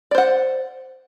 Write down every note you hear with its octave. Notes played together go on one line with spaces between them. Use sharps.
C5 D5 F#5